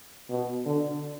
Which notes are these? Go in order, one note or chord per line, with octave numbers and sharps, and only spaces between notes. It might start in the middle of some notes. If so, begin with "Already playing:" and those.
B2
D3